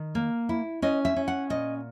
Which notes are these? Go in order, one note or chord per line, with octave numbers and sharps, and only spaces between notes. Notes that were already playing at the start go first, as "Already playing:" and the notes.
Already playing: D#3
A#3
E4
C#4 D#5
E5
C#4
F#5
A#2 D#5